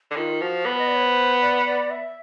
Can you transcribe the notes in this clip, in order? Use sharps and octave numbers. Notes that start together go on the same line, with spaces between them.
D3
D#3 F4
F3 F#4
B3 B4
D#5
D5
C#5
C5
D5
D5
E5